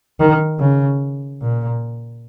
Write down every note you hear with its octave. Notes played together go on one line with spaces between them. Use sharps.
D#3
C#3
A#2